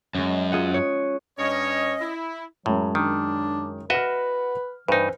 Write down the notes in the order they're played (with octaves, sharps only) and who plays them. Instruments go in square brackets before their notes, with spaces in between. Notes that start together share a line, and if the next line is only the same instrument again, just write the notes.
[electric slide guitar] F#2 [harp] G#3 C#4
[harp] F4 G#4 F#5
C#5
[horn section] G2 C#5 [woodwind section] C#4 D#5
[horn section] E4
[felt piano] F#2 G#3 [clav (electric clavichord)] A2 [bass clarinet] F#3
[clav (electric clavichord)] D#3 [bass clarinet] D4
[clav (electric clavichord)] F#4 D#5 E5 [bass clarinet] B4 [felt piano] F#5 F6
[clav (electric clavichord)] G2 D#4 [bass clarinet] E3 [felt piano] B4 C5